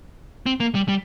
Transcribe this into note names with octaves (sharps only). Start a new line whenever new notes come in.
C4
A#3
G3
G3